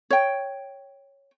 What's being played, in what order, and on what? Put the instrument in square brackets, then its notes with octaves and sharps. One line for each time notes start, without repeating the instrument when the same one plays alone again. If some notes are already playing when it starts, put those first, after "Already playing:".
[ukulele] C#5 G5